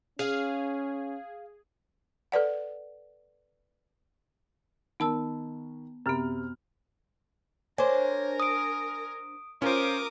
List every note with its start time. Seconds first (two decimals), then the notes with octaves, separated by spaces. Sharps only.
0.19 C#4 G#4 F5
2.32 A4 B4 D5 F#5
5.00 D#3 B3 A5 E6
6.06 F#2 C3 B3 F6
7.78 D4 A#4 C5 C#5 G#5
8.40 D#6 D7
9.62 C#4 F4 A#4 C5 D6 D#6